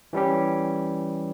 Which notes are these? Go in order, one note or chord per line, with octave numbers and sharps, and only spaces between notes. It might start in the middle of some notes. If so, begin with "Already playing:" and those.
E3 G3 C#4 G4